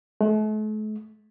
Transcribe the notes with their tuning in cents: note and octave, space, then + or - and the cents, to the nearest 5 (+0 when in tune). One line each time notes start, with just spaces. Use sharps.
A3 -45